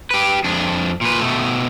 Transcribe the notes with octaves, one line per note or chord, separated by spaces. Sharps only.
G4 B4
F2 D4
A#2 B4
B2 A3